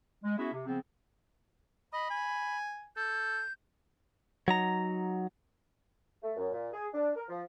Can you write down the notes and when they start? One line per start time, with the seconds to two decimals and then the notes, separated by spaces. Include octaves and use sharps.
0.23 G#3
0.38 B3 C#4 E4 F#4 G#4 E5
0.53 C3
0.66 C#3 F3 B3 C4
1.93 D#5 B5
2.10 G#5
2.97 A4 G6
4.48 F#3 D#4 A#5
6.23 A3
6.37 F#2
6.52 A#2
6.73 G#4
6.94 D4
7.16 A#4
7.29 F3